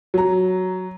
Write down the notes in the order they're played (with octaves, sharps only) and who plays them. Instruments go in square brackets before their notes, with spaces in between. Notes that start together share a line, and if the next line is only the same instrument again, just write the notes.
[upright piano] F#3 A#5